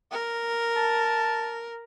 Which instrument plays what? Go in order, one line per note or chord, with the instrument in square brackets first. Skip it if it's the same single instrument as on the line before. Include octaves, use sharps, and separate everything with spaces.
[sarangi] A#4
[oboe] A5